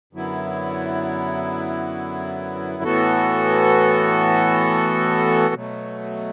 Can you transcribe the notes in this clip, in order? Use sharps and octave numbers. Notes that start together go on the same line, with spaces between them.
F#2 D3 F#3 B3 E4
A2 E3 B3 F#4 A4
B2 F#3 A3